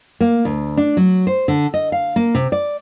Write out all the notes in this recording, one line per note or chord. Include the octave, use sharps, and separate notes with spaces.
A#3
D2
D4
F#3
C5
D3
D#5
F5
A#3
C3
D5